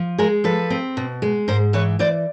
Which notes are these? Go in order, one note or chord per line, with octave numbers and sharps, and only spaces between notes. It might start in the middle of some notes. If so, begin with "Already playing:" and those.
Already playing: F3
G#3 G#4 A#4
F3 A4 B4
C4
B2
G#3
G#2 A#4 C5
E3 B4 C#5
E3 C5 D5